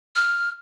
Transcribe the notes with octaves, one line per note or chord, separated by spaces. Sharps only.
F6